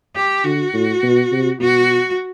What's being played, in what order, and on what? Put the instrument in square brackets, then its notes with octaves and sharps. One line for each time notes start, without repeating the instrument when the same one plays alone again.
[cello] G4
[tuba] D3 [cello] F#4
[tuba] A2
B2
C3
[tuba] B2 [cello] F#4